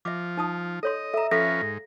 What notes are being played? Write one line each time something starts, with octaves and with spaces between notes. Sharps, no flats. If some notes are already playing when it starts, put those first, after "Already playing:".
F3 E5 D6
D#4 A5 D#6
A4 C#5 D#5 C6
A4 E5 A#5
F3 C#4 A4 B4 F5 A#6
G#2